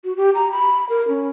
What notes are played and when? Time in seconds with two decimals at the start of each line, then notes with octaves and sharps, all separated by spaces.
0.04 F#4
0.17 G4
0.35 A#5
0.52 B5
0.89 A#4
1.08 C#4